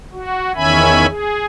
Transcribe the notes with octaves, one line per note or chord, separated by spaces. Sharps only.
F#4
E2 D#3 C#4 E5 G#5 B5
G#4